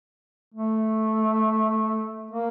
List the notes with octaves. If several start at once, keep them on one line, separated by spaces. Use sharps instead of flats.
A3
A#3